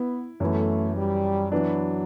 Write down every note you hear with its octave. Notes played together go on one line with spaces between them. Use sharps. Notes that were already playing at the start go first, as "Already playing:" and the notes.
Already playing: B3 E4
F#2 E3 A3 B3
G3
E3 F#3 B3 D4